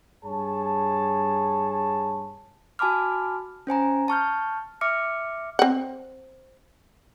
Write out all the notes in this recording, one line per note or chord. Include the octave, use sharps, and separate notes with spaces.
G2 G#4 C#5 A5
F#4 G#5 A5 B5 D6 F6
C#4 C5 G#5 A#5
A5 C#6 F6 G6
E5 D6 F6 C#7
C4 F#5